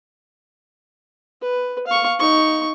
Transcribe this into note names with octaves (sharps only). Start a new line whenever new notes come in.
B4
F5 C#6
D#4 C#6